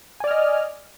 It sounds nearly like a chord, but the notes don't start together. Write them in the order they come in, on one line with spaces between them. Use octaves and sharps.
G#5 D5 F6 D#5